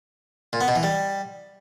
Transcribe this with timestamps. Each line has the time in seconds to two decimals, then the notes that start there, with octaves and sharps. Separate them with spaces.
0.53 A#2
0.61 B3
0.68 B2
0.76 E3
0.83 G3